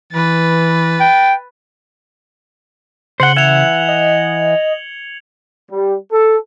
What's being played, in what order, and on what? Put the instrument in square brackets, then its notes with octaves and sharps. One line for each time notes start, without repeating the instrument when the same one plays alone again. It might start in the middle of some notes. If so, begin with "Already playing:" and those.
[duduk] E3 [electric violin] B4 A6
[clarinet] G5
[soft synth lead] C#3 [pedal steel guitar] C5 F#5 [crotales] C#7 F#7 G7
[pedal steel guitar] E3 E5 F#5 [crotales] G#6 F7
[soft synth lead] D#5
[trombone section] G3
A4